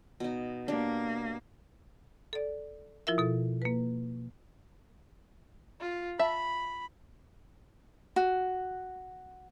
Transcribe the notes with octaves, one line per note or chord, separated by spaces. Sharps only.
B2 D#4
A#3 D4 G4
A4 D5
F3 E4 F4 A#4 E5
B2 A4
A#3 B4
F4
E5 A5 B5
F#4